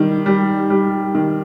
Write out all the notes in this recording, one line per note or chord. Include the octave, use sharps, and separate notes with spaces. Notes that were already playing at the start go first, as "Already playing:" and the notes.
Already playing: D#3 G3
G3
G3
D#3